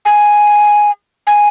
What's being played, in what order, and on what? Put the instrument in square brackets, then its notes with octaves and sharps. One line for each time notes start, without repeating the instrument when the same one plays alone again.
[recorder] G#5
G#5